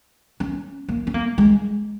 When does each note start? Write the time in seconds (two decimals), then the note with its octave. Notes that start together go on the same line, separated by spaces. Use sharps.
0.40 C#4
0.88 A#3
1.07 C#4
1.14 A#3
1.38 G#3